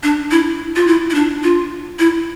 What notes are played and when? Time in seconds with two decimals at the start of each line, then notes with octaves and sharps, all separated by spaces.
0.03 D4
0.31 E4
0.76 F4
0.87 E4
1.10 E4
1.14 D4
1.43 F4
1.99 E4